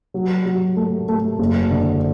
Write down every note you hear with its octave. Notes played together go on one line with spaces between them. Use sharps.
F#3
F#3
A3
A3
F#1
D3